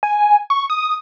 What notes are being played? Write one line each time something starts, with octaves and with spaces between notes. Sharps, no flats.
G#5
C#6
D#6